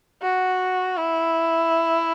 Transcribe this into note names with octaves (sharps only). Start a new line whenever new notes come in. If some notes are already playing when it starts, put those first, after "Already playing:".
F#4
E4